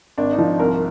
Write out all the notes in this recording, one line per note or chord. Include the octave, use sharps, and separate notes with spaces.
G#1 D4
D#4
F3
C2 A#4